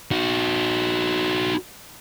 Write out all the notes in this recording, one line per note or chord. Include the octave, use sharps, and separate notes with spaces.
D#4 F#4